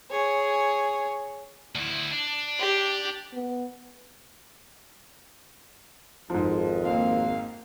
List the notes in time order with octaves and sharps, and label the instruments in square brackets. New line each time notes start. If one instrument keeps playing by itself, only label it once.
[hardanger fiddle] G#4 C#5
[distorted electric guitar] D2 E4
D4
[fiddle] G4
[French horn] B3
[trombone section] G#1 F2 [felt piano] G#2 F3
[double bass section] A#3 C4 [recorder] F5